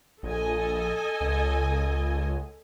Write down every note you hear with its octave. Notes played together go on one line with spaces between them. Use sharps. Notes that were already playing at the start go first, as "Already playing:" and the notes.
A#1 A4 D#5 G#5
C#2